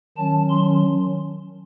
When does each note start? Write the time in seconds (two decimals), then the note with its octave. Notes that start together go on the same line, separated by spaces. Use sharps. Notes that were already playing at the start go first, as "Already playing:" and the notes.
0.17 D#3 F#3 C#4 A5
0.50 C6